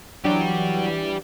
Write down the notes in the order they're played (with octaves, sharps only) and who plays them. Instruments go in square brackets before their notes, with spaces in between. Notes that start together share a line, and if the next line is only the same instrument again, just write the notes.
[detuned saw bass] E3 [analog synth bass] F#3 [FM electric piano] D4 [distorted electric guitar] G4 D5